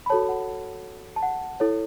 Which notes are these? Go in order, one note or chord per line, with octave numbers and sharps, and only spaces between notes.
B5
F#4 A4 C#5 A5
F#5
A5
F#5
E4 A4 C#5